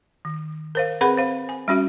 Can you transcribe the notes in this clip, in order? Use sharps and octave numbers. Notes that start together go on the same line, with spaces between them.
D#3
A#4 C5 F5
C4 G#4 A#4 B4 F#5 B5
C5 F5
G#5
G3 C#4 F#4 E5